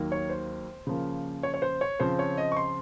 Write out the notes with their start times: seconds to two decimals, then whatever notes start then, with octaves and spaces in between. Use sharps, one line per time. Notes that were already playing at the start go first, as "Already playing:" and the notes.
Already playing: D#2 D#3 F#3 A#3
0.12 C#5
0.30 C5
0.87 C#3 F3 A#3
1.43 C#5
1.54 C#5
1.62 C5
1.81 C#5
1.99 C#3 F3 C4 C5
2.19 C#5
2.38 D#5
2.52 C#6
2.57 C6